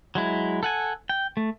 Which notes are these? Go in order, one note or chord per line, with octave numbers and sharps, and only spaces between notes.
F#3 G#3 E4
A4 F#5 G#5
G5
A3